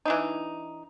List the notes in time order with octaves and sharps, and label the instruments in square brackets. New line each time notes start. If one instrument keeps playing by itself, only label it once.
[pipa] E3 D4 D#4